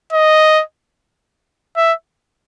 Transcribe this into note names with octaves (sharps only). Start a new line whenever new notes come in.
D#5
E5